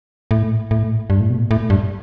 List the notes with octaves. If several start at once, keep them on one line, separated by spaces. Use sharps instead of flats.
A2
A2
G2
A2
B2
A2
G2